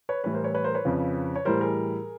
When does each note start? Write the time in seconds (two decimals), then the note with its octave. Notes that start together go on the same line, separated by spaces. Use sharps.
0.09 B4 C#5
0.24 A2 E3 G3 B4 C#5
0.34 A#4 C5
0.44 B4 C#5
0.54 B4 C#5
0.64 A#4 C5
0.75 B4 C#5
0.85 F2 C#3 F3
1.36 C#5
1.45 A2 E3 G3 A#4 C5
1.60 G#4 A#4